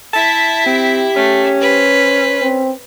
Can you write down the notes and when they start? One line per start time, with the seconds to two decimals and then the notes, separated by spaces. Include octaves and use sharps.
0.14 E4 E5 A5
0.66 C4 G4
1.17 A3 C#4
1.61 B4 C5
2.42 C4